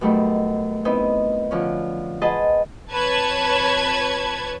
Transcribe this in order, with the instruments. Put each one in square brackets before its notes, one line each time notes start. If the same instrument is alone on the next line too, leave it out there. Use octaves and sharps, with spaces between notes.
[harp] F#2 B2 G3 A3 D#4
B3 C4 D#4 E4
D3 F3 C#4
G#4 B4 C5 D#5 F#5 A5
[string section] F2 B4 C#5 A5 G#6